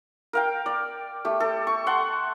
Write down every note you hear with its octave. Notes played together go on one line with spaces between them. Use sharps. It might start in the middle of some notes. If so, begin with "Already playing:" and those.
A#4 F5 G5
D5
A3 G4
A4
C#6
F#5 C6 C#6